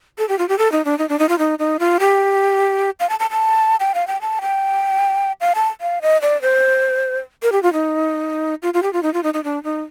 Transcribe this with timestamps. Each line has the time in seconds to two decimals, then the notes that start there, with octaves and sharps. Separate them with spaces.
0.18 A4
0.29 G4
0.39 F4
0.49 G4
0.59 A4
0.72 D#4
0.85 D4
0.99 D#4
1.09 D4
1.19 D#4
1.29 F4
1.39 D#4
1.59 D#4
1.80 F4
2.00 G4
3.00 F5
3.10 A5
3.20 A5
3.31 A5
3.80 G5
3.95 F5
4.07 G5
4.21 A5
4.41 G5
5.41 F5
5.55 A5
5.81 F5
6.02 D#5
6.22 D5
6.42 C5
7.43 A#4
7.52 G4
7.63 F4
7.73 D#4
8.63 F4
8.74 F4
8.83 G4
8.93 F4
9.03 D#4
9.14 F4
9.23 D#4
9.34 D#4
9.44 D4
9.64 D#4